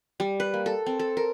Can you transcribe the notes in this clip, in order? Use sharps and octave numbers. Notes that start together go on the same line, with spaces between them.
G3
B4
A#3
A4
C4
A4
A#4